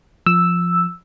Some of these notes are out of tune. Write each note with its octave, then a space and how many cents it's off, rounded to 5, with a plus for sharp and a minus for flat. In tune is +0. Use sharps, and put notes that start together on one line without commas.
F3 +0 E6 +0